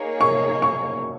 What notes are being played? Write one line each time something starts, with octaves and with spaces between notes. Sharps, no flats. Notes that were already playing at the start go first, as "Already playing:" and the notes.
Already playing: A#3 D#4 G#4 C#5
C#6
C#6